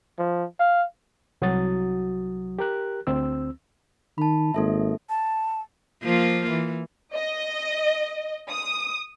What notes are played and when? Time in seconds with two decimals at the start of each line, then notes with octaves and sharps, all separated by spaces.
0.19 F3
0.59 F5
1.42 C2 F#3 F#4 D#6 A6
2.59 G4 A#4 F#6
3.07 D2 C4 E6
4.18 D#3 A5 B5
4.54 G#1 A#3 A4 E5
5.09 A5
6.03 F3 A#3 F4
6.50 E3
7.14 D#5
8.50 D#6